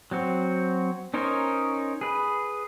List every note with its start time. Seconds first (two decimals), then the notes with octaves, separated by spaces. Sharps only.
0.11 F#3 C4 F#4
1.14 C#4 D#4 A#4 C5 C#5
2.01 G#4 B4